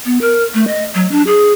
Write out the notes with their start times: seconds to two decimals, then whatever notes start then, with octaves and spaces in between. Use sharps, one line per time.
0.05 B3
0.21 A#4
0.54 A3
0.68 D#5
0.95 F#3
1.11 D4
1.27 G#4